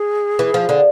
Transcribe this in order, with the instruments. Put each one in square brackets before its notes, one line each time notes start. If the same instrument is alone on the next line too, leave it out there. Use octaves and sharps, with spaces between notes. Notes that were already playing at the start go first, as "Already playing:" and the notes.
Already playing: [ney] G#4
[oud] E3
F3
D3